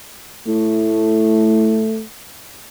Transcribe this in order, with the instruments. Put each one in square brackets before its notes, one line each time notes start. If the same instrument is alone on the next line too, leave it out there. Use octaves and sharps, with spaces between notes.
[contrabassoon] A2 [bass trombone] A3